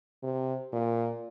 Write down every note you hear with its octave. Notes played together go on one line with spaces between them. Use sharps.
C3
A#2